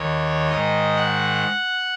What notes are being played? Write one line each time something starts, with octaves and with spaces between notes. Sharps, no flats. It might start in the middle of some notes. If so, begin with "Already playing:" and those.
Already playing: D#2 D#3 C#5
G#2 D#3 D#5
F#5